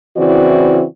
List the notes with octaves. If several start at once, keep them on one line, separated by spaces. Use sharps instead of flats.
C#3 E3 C4 E4 F#4 D5